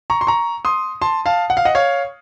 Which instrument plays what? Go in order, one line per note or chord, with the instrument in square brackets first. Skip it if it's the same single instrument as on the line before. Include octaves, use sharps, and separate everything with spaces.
[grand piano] A#5 C#6
C6
A#5 C#6
C6 D#6
A5 C6
F5 A5
F#5
F5
D#5 F#5
C#5 F5